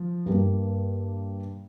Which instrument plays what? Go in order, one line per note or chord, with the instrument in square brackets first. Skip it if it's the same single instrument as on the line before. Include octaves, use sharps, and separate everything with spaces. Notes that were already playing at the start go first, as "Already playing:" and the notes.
Already playing: [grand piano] F3
G2 G3 A#3